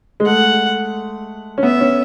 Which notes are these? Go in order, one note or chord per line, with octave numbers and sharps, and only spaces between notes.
G#3
A3 F#5
C#4
B3 E5
C#4